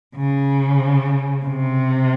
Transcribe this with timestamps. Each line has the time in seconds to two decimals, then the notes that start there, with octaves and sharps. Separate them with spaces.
0.16 C#3
1.45 C3